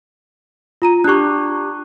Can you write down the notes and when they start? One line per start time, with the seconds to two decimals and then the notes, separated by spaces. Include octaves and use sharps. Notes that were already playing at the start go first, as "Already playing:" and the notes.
0.82 F4 A#5 D#7
1.04 D4 G4 C#6 F#6